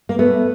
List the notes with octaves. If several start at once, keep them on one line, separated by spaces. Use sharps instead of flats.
A#3
A3 B3